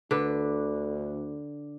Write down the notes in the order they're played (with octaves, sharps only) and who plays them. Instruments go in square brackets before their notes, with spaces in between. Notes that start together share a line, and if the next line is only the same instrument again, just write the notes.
[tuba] D2 [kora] D3 B4